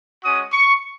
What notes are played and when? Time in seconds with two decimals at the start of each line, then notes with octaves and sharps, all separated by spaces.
0.23 G#3 C#4 F#4 D#6
0.53 C#6